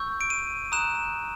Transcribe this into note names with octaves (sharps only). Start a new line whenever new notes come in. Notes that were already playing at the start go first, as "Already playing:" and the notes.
Already playing: C#6 E6 G6
D7
D#7
A#5 D#6 F#6 E7